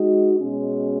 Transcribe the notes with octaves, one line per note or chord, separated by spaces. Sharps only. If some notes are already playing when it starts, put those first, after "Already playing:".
Already playing: G#3 D#4 F#4
B2 G#3 C#4